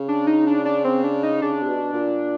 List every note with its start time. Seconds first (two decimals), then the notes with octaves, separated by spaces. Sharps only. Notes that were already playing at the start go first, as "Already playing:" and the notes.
Already playing: C#3
0.08 D4
0.27 D#4
0.47 D4
0.65 D4
0.84 C4
1.04 D4
1.23 D#4
1.42 C#3 D4
1.63 C3
1.68 B2
1.93 A#2